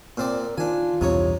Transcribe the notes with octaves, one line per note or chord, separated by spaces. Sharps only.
A#2 C4 A#4 D5
D#3 D4 F4 G#5
B1 E2 G2 C3 D#4 C#5